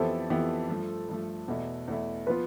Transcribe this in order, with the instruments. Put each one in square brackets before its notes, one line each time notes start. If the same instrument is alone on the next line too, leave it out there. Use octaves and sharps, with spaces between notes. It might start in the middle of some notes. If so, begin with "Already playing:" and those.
Already playing: [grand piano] F2 E3 B3 E4 G4 [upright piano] A4 C5
[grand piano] F2 E3 B3 E4 G4
G2 F3 A3
G2 F3 A3
E2 B2 A3 E4
E2 B2 A3 E4
[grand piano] F3 B3 F4 [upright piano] B4